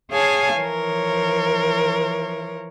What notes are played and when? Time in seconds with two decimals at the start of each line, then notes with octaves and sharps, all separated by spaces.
0.11 G#4 C#5 F5 G#5 A5
0.59 E3 F3 A#4 C#5